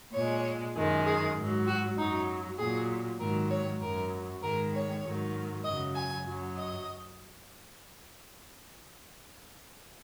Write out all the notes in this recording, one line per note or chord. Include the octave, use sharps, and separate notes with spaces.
A#2 G#3 C#5
F#2 D#3 G#3
G#4
G#2 F#3
F#4
F#2 F#3 D#4
A#2 F#3 G#4
G#2 D#3 F#3 A#4
C#5
F#2 F#3 A#4
G#2 D#3 G#3 A#4
C#5
G#2 D#3 F#3
F#2 C#3 F#3 D#5
G#5
F#2 F#3
D#5